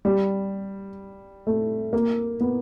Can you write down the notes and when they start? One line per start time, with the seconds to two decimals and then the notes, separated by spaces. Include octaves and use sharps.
0.05 G3
1.47 A3
1.93 A#3
2.41 B3